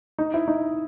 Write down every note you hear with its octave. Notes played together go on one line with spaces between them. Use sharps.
D#4
E4
D#4